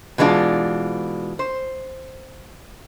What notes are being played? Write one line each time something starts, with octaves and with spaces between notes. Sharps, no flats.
B2 E3 G#3 D4 F4
C5